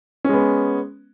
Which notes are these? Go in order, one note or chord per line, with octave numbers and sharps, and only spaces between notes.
G#3 B3 C#4